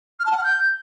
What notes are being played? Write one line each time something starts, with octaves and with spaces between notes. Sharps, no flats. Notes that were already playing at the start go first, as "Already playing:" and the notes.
F6
A5
F#5
F6
G6